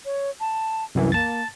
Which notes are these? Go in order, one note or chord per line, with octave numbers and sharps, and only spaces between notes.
C#5
A5
C2 F#2 E3
A#3 A5 A6